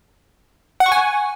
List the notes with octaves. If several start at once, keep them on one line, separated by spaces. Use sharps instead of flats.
F#5
C#6
G#5